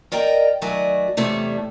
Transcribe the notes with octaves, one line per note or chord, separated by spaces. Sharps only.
A#4 D5 D#5 G5 A#5
D#3 F#3 A3 F#4 D5 G#5
E2 C3 G3 A3 C#5